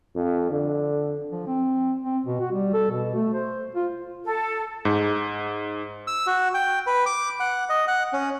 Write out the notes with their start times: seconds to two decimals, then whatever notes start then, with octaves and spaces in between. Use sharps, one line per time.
0.16 F2
0.51 D3
1.32 F3
1.47 C4
2.04 C4
2.27 B2
2.40 F#4
2.52 G3
2.74 A4
2.91 B2
3.15 A3
3.34 C5
3.75 F4
4.25 A4
4.85 G#2
6.07 E6
6.27 F#4
6.54 G5
6.87 B4
7.06 D6
7.40 F#5
7.69 D#5
7.88 F#5
8.13 C#4